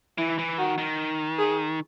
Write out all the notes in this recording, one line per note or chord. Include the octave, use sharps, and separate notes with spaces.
E3 E4
E3
D#3 F#4
D#3
G#4